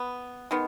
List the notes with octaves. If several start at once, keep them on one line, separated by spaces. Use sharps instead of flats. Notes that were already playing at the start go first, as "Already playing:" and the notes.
Already playing: B3
D#3 G#3 B3